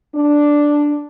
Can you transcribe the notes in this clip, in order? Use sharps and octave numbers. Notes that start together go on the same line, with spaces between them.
D4